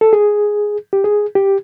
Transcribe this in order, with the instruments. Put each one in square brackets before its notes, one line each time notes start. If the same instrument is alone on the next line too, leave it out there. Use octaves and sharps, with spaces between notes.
[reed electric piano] A4
G#4
G4
G#4
G4